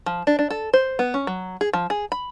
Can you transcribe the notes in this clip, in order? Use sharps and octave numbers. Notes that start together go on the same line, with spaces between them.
F3
D4
D4
A4
C5
B3
C#4
F#3
G#4
F3
G#4
B5